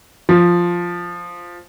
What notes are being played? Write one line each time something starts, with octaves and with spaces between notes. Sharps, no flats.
F3